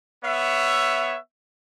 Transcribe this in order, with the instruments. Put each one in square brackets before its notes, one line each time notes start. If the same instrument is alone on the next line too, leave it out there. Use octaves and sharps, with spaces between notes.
[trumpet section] B3 C#5 E5